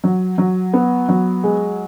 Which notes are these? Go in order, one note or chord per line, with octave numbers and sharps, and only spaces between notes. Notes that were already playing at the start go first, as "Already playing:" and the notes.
F#3
F#3
B3
F#3
G#3